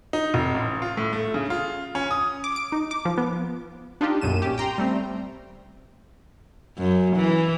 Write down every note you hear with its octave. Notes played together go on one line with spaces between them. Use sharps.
D#4
F1
A1
F4
A2
A3
C#3
F4
C#4
D#6
D6
D7
D#4
D6
F3
B3
D4 D#4 F4 G4
B1 F#2 A#2 F#3 D#7 E7
C#4 G4
G5 A#5 C6
G3 A3 C4
F#2
E3